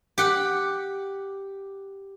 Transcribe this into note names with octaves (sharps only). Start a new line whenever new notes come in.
G4 F#5